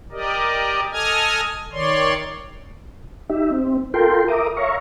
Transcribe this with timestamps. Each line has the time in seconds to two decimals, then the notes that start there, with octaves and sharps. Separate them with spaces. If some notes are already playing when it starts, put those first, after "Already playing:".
0.12 G4 A#4 D5 D#5
0.92 A4 D#5 G#5 D#6 F6 G#6
1.72 D#3 C#5 D5 C6
3.29 D#4 G4 E5
3.51 C4
3.94 F4 A4 A#4 G5 C6
4.28 A#4 E5 A#5 D6 D#6
4.57 C#5 E5 F5 A#5 C#6